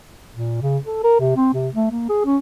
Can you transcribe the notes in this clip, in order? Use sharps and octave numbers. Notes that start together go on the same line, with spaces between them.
A#2
C#3
A4
A#4
C3
C4
C3
A3
A#3
G#4
C#4